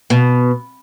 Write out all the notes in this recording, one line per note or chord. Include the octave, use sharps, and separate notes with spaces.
B2